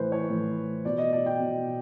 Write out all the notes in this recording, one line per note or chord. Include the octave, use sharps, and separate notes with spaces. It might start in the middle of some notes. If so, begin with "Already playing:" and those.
Already playing: A2 E3 B4 C5
C#5
A2 E3
B2 D5
D#5
D5
G5
B2